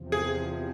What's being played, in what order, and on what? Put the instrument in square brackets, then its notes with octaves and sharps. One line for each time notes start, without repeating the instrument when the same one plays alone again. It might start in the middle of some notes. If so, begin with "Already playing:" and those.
Already playing: [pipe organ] E2 C3 F3
[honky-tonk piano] G#4